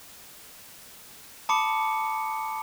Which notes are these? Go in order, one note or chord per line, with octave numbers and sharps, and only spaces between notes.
A5 B5 D6 D#6 C#7